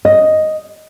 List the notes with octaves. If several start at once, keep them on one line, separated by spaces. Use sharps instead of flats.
D#5